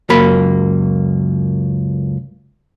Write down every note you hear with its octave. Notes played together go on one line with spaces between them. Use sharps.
C#2 F#2 A#3 B5